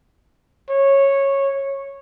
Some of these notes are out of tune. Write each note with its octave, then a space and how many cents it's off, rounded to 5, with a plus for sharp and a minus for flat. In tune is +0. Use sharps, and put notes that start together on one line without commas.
C#5 -10